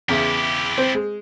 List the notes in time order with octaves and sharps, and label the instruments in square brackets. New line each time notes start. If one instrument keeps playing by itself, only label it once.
[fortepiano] E2 C#3 [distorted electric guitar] E4 G4
[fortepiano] C4 C5
G#3